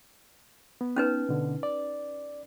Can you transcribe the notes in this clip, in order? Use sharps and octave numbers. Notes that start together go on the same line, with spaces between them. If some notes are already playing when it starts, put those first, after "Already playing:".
B3
C#4 D#4 B4
B2 D3
D5